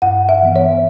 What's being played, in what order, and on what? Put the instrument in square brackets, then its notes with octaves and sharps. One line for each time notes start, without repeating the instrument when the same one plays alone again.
[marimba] G2 F#5
E5
E3 B3
C#5